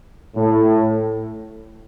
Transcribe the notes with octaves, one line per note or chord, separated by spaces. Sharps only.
A2